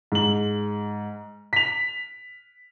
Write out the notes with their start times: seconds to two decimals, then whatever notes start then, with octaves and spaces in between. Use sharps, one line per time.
0.12 G#2 F#7
1.53 B6 F7